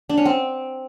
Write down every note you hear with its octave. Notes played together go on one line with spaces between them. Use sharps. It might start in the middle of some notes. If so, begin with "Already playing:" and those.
D4
C#4
C4